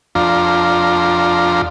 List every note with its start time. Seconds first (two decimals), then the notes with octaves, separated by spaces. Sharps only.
0.15 F2 D4 F4 A#5